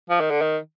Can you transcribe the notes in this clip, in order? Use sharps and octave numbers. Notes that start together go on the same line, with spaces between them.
F3
D#3
D3
D#3